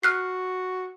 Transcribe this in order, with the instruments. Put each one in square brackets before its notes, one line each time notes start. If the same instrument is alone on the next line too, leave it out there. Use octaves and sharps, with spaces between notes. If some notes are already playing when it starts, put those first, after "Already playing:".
[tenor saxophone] F#4 [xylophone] F6 F#6 C7